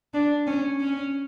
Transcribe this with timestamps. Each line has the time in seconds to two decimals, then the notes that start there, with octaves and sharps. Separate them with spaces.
0.14 D4
0.47 C#4
0.80 C#4